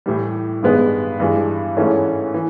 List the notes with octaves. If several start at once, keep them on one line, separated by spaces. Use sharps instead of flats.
A2 E3 G3
G2 D#3 G#3 B3
G2 E3 G#3
G#2 E3 A3 C#4
E3